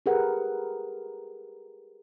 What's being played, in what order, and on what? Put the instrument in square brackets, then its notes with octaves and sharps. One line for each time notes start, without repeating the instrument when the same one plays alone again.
[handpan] G4 G#4 A#4 B4 F#5